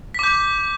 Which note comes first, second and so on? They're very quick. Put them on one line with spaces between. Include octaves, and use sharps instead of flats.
B6 D6 G6